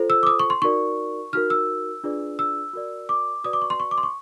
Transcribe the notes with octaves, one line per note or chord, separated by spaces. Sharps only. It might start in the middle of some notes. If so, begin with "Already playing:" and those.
Already playing: F4 A4 C5
E6
D6
D#6
C#6
C6
D#4 F#4 A#4 D5 C#6
D#4 F#4 A#4 F6
E6
D4 F4 G#4 B4 D5
E6
F#4 A#4 D5
D6
F#4 B4 D5 D#6
D6
C#6
C6
C#6
D6
C6
C#6